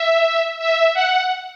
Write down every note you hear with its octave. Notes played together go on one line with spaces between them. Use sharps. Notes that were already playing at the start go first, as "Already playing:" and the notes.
Already playing: E5
E5
F#5